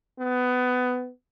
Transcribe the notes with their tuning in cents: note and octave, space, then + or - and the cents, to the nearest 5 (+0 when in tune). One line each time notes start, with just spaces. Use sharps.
B3 +20